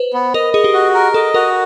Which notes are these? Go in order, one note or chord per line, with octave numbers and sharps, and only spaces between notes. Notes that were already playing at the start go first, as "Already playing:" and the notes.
Already playing: B4 C5
B3
A#4 D#5
G#4 D#5
G4
F#4
A#4
A4 D#5
F#4 A#4